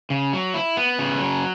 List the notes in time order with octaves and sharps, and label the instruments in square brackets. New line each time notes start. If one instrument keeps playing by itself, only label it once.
[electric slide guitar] C#3
F#3
E4
B3
C#3
F#3